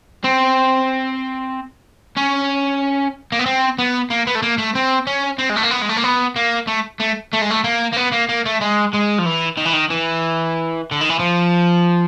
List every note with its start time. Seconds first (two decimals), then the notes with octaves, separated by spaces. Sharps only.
0.24 C4
2.17 C#4
3.32 A#3
3.39 B3
3.46 C4
3.79 B3
4.10 A#3
4.27 B3
4.35 A3
4.42 A#3
4.58 A3
4.75 C4
5.07 C#4
5.39 C4
5.50 G#3
5.57 A3
5.63 A#3
5.71 B3
5.82 G#3
5.89 A3
5.97 A#3
6.04 B3
6.36 A#3
6.68 A3
7.00 A3
7.33 A3
7.41 G#3
7.50 A3
7.64 A#3
7.93 A#3
7.97 B3
8.12 A#3
8.29 A#3
8.45 A3
8.61 G#3
8.93 G#3
9.18 F3
9.25 E3
9.57 D#3
9.65 E3
9.73 D#3
9.90 E3
10.91 D3
11.01 D#3
11.10 E3
11.19 F3